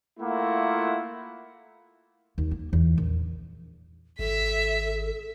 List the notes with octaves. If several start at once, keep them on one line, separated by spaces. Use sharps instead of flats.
A3 A#3 E4 F4 F#5
D#2
A#3
E2
A#1
G#1 A4 E5 B6